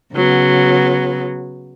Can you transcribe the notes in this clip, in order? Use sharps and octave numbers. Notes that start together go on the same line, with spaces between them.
C#3 F#3 B3